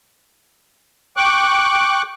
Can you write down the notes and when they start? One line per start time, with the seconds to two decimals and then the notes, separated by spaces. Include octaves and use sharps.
1.17 G5 C#6 D6 F#6